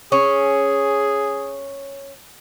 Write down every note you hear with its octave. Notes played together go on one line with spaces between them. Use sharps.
C#4 G#4